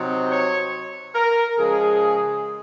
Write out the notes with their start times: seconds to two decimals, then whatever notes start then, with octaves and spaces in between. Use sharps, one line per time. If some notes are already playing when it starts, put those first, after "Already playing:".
Already playing: C3 F#3 C4 D#4
0.29 C#5
1.14 A#4
1.58 C#3 F3 G#3 G#4